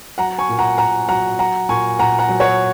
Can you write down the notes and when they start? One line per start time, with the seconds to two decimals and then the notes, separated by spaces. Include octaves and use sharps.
0.18 F#3 F#5 A#5
0.38 G#5 C#6
0.49 A#2
0.59 F#5 A#5
0.78 A#2 F#5 A#5
1.09 F#3 F#5 A#5
1.39 F#3 F#5 A#5
1.69 A#2 G#5 C#6
1.99 A#2 F#5 A#5
2.19 F#5 A#5
2.29 F#3
2.40 C#5 F#5